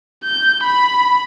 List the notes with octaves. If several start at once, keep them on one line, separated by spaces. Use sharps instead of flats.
G6
B5